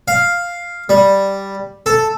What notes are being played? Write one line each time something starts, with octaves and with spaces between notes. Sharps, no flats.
F5
G3
A4